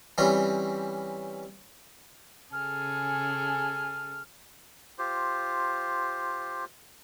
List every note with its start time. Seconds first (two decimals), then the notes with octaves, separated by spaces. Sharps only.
0.18 E3 G3 C4 C#4
2.53 C#3 G#4 A4 G#5 F6
4.99 F4 G4 C5